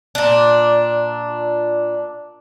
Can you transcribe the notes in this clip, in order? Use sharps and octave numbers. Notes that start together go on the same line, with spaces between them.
A#2 D4